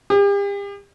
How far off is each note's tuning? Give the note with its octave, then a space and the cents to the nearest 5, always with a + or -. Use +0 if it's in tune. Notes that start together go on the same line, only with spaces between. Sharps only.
G4 +40